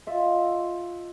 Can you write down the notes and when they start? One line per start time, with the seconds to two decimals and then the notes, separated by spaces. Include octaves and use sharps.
0.07 F4 D#5 E5